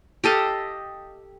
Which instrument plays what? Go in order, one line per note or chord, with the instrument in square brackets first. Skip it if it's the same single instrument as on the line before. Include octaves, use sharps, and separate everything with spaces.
[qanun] G4 A4 D#5 F5